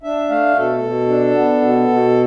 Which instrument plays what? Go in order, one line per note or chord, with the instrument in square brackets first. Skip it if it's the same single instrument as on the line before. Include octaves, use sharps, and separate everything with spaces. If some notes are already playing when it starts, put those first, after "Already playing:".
[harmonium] D4 E5
A3 F5
B2 A4
B2
D4
B3
B2
B2